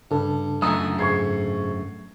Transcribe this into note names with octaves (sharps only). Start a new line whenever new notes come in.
G2 C#3 D4 A4
F#2 A3 D#5 G#5 A#5 D#6 E6
G#2 C#6 G#6 C7